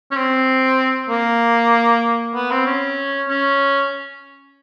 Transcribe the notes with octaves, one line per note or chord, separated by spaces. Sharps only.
C#4
C4
A#3
B3
C4
C#4
C#4